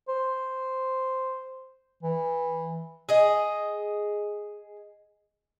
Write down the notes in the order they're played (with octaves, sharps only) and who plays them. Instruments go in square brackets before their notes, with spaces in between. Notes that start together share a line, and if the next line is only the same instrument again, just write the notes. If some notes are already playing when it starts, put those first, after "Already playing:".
[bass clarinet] C5
E3
[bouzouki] G#4 D#5